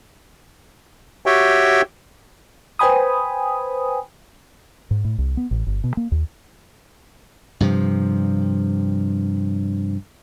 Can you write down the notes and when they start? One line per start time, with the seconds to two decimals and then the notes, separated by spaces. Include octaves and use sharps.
1.26 F#4 G4 C#5 E5 G5
2.79 B4 C5 G5 G#5 B5 D#6
4.91 G#2
5.05 A2
5.18 C2
5.37 B3
5.51 A1
5.67 G1
5.84 B2
5.97 A#3
6.12 D#2
7.60 G2 C3 F3